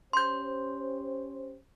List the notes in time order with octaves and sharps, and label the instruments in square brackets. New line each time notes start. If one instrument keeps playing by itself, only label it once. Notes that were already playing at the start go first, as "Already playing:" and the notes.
[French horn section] C#4 G4 C5 [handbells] C6 G6